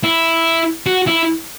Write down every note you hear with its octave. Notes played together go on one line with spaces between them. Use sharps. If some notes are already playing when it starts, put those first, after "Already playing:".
E4
F#4
E4